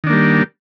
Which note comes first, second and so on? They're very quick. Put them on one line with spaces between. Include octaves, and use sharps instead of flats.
D#3 D4 A#3 G3